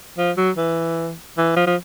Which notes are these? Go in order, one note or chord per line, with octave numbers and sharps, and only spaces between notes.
F3
F#3
E3
E3
F3
F3